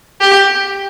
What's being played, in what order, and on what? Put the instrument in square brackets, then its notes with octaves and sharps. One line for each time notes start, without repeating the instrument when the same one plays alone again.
[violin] G4